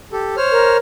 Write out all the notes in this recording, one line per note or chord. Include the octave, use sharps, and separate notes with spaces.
G4 A4
C5 C#5 F6
A#4